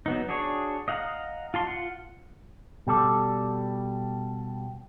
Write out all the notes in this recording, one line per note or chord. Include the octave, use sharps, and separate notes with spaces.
F#3 B3 D#4
D4 F#4 G#4 C#5
D#5 F5 F#5 A5 A#5
F4 A5 C6
F4 F#5
B2 G3 A4 D5